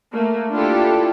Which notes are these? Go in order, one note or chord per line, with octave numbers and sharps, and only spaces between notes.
A3 A#3
D4 E4 F4 G4 A4